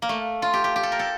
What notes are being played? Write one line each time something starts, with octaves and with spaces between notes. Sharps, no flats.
A#3
A3
F4
G4
G4
G4
A4
A#4
A4